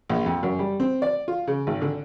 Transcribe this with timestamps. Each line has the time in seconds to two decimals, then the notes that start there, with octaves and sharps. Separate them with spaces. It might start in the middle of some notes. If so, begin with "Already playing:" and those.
0.10 A#1
0.26 F2
0.43 F#2
0.59 G3
0.80 C4
1.02 D5
1.28 F4
1.48 C#3
1.67 G#1
1.82 D3